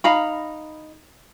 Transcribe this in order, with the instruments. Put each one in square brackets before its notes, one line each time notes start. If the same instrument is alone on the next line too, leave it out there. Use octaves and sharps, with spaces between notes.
[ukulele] D#4 F5 A#5 B5